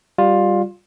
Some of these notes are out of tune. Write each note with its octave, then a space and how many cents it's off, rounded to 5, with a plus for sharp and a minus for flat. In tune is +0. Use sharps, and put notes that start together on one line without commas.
G3 +0 F4 +15